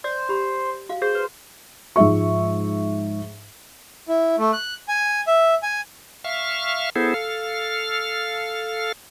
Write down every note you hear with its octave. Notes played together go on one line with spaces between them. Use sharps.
C5 D5
G4 B5
F#4 F5
G#4 C5
B4
G#2 F3 G#3 E5 C#6
E4
A3
F#6
G#5
E5
G#5
E5 F5 C#6 F6
B3 E4 G#4 A4 C5
A4 F5 F6